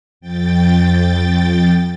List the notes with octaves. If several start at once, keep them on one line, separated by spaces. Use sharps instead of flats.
F2 G5 A6